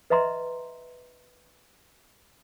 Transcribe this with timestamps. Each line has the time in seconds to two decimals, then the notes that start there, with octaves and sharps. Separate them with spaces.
0.10 B4 D#5 E5 A#5 C6